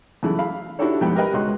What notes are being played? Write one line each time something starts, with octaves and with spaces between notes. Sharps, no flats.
F#2 C#3 E3 A3 E4
F5 B5
D4 E4 F#4 G4 A4 C#5
F2 G#2 G3 B3 G5 B5
G4 A#4 B4 D#5 G5 B5
C#2 F#4 D#5 C6 F#6